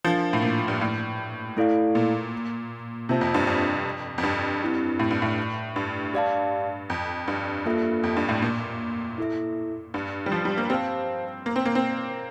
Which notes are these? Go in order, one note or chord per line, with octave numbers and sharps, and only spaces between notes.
F3 D4 F4 A#4 F5
A2
A#2
G2
A2
A3 E4 A4 D5 F5
A#2
C3 A#3 F4 C5 E5 A5
F2
G2
F2
F2
G2
C4 E4 G4
A2
G2
A2
G2
G4 D5 F5 A5
F2
G2
A#3 F4 A4 E5
F2
G2
A2
A#2
E4 A4 E5
G2
G3
F3
G3
A#3
C4 G4 C5 F5 A5
A#3
C4
A#3
C4